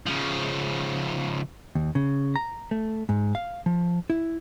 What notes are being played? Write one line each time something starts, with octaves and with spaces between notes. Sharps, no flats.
C#3 F3
D#2
C#3
A#5
A3
G#2
F5
F3
E4